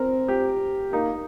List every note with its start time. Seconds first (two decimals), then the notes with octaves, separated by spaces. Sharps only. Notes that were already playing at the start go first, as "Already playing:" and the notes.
Already playing: C4 A#4
0.28 G4
0.92 A#3 D#4